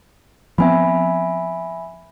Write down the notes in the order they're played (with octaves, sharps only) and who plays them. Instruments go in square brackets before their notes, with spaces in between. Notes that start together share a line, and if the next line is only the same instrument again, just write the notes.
[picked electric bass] F3 B3 C4 [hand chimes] E5 G#5 B5